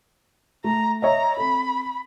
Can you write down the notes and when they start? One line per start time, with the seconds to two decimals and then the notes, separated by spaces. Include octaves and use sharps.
0.64 A3 A#5
1.02 C#5 D#5 E5 A#5
1.37 C4 A4 B5